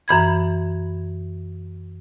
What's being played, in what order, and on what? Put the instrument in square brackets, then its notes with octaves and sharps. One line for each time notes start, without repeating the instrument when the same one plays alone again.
[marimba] F#2 E3 B5 G#6